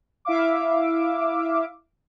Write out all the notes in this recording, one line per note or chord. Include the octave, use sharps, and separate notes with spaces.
E4 E5 F5 D6